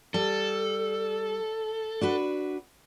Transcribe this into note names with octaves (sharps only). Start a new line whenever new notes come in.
G3 A4
D4 F#4 B4